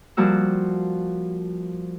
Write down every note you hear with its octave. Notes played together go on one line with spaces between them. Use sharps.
F3 G3 A#3 F#4 E6